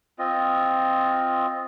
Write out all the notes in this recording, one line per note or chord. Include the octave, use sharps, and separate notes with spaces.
C4 F4 D#5